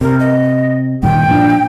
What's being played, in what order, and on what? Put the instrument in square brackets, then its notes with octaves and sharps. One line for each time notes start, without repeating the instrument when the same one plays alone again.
[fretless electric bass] C3 [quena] A#4
[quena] D#5
[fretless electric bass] G2 A#2 D#3 [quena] G5
[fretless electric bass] A#2 F3 D4